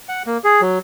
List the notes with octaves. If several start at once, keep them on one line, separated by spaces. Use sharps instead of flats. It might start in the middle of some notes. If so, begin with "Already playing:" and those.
F#5
A#3
G#4
F#3